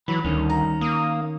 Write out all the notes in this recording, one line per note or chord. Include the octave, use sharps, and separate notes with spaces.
E3 F#3 B5
D2 D#3 G3 C#4
A#5
A#3 D#6